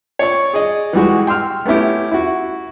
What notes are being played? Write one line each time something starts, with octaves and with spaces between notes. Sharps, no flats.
C#5 D5 C#6
G#4 D5 D#5
E3 G3 G#3 F#4
G5 C6 E6 F6
A3 B3 C#4 E4 G4
E4 F#4